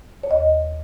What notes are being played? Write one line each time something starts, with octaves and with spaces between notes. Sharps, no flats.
C#5
D#2 D#5